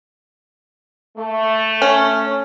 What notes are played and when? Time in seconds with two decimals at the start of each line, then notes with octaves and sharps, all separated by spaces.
1.17 A3
1.82 C#4